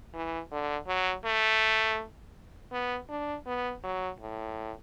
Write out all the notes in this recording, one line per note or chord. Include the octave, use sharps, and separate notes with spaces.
E3
D3
F#3
A3
B3
D4
B3
F#3
A2